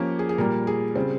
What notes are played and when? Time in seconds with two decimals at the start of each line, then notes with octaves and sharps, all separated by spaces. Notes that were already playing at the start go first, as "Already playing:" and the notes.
Already playing: F3 A#3 C#4 G4
0.19 G#4
0.29 G#4
0.38 A#2 G3 A#3 A#4
0.67 G#4
0.95 C#3 G3 C4